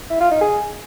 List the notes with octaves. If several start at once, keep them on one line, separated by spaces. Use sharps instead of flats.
E4
F4
D#4
G#4